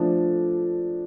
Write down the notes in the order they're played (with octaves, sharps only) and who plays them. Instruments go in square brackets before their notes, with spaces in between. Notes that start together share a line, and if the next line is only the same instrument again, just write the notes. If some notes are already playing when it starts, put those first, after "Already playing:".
Already playing: [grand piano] F3 A3 D4 A4